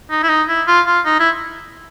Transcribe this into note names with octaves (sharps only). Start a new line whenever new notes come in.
D#4
E4
D#4
E4
F4
F4
D#4
E4